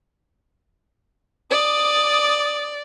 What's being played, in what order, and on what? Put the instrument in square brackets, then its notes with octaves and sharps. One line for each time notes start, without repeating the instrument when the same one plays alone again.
[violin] D5 [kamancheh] D6 D#6